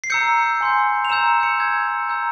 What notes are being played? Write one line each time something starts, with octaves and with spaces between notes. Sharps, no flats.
C7
A#5 E6 G6 C#7
G#5 C6 G6
F7
A#5 E6 G6 E7
C#7
C#7
G#5 E6 G6 G#6
A#5 E6 G6